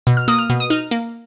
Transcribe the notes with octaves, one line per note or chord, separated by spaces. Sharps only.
B2
F6
A#3 D#6
F6
B2
D#6
D#4 F6
A#3